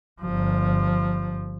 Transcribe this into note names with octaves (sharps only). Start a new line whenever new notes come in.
G1 F3